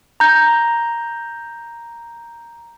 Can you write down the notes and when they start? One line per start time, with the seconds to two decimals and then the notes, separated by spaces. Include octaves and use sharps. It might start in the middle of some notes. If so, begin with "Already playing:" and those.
0.20 A#5 G6